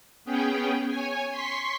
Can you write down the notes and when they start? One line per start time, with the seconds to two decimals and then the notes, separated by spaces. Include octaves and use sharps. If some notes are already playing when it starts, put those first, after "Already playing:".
0.25 B3 C#4 G#4 G5
0.88 C#5 G#5
1.31 C6 C#6 B6